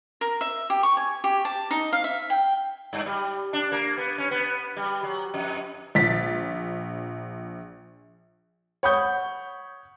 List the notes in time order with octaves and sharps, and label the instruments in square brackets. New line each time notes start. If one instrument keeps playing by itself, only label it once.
[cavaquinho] A#4
E5
G4
C#6
G#5
G4
A5
D#4
F5
E5
G5
[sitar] G2
G3
D4
A#3
B3
C#4
B3
G3
F#3
F2
[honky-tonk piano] A#1 A6 B6
[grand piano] C#5 F#5 B5 C#6 D#6 G6